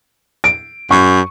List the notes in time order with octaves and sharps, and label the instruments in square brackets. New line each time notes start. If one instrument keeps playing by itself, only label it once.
[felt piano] D7
[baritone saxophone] F#2 [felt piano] C#6